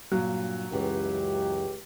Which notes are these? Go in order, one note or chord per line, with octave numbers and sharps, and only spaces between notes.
G2 A#2 F#3
C#2 F#2 E3 G4